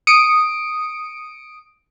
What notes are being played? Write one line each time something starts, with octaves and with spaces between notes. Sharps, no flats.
D#6 C#7 D7